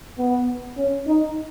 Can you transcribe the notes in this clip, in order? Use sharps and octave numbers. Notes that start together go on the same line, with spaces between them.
B3
C#4
D#4